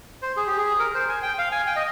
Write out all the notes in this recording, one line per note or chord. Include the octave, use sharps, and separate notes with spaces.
C5
G#4
G4
G#4
A#4
C5
G#5
G5
F5
G#5
G5
D#5